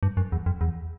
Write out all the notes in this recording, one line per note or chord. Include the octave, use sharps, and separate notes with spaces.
G2
F#2
E2
F2
E2